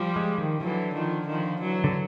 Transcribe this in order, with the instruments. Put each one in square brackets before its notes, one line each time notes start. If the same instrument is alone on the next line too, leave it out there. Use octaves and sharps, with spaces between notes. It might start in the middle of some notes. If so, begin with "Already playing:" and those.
Already playing: [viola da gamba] F3 G3
[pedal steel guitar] G#3
D#3
[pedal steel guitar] D3 [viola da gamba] E3 F#3
[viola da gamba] D#3 F3
D#3 F3
E3 F#3
[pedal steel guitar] D3